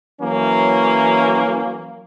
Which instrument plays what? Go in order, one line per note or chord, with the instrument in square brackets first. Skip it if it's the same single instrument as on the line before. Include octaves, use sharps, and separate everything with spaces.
[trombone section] E3 F#3 A#3 C#4